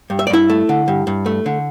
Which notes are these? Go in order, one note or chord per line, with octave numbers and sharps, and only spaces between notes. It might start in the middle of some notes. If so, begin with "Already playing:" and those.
G2
E5
D5
G2 E4 E5
A3
D3
G2
G2
A3
D3